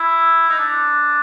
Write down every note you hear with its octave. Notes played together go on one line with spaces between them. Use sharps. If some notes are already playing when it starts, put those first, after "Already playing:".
Already playing: E4
D#4
D4